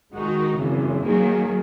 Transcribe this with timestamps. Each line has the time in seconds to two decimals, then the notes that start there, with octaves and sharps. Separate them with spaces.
0.13 D#3 G#3 D#4 F#4
0.58 G#1 F#2 C#3 E3
1.03 D#3 F#3 A#3 D#4 G#4